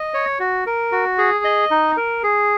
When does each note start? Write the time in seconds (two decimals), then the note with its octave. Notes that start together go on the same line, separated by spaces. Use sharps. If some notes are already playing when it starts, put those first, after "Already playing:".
Already playing: D#5
0.14 C#5
0.40 F#4
0.66 A#4
0.92 F#4
1.18 G#4
1.45 D#5
1.71 D#4
1.97 A#4
2.23 G#4